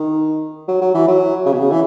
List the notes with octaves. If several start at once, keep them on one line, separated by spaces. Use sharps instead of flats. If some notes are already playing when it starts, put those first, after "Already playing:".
Already playing: D#3
F#3
F#3
E3
F#3
C#3
B2
C#3
E3